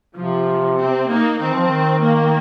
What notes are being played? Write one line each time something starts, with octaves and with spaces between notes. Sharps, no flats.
C3 F3
C4
A#3 D#4
D#3 C4
F3
D#3
A#3